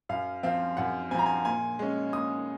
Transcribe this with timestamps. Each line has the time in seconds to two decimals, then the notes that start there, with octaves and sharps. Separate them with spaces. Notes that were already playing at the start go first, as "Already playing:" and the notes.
0.09 F#2 F5
0.43 F3 C4 F5
0.77 F#2 F#5
1.11 C4 G#5
1.14 F3 A#5
1.26 G#5
1.45 A#2 G#5
1.79 G#3 C#4
2.13 A#2 D#6